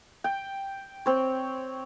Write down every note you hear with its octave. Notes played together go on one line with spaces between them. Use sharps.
G5
C4 C#5